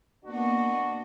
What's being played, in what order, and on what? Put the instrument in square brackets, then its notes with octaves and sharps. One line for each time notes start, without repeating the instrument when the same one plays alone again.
[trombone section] B2 D4 F#4 [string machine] A#3 B3 D#5